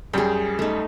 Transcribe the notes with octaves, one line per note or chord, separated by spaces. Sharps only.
F#2 G3 G#4 G5
A3 D#4